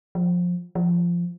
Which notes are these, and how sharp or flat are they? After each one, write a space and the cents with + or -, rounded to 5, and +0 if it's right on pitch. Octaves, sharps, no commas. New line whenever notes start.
F3 +20
F3 -10